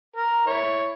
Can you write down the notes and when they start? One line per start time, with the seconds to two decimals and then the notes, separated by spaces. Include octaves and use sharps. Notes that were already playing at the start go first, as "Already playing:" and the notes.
0.16 A#4
0.47 E4 C#5